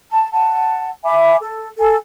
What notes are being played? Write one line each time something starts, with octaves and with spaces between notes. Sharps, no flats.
A5
F#5 A5
E5 G#5 B5 D6
A4
A4 G#5